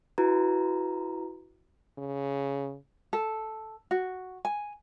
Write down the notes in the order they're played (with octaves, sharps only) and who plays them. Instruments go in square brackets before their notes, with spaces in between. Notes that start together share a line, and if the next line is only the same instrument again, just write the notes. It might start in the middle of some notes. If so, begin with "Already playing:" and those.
[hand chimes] E4 F#4 B4 A#5
[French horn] C#3
[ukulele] A4
F#4
G#5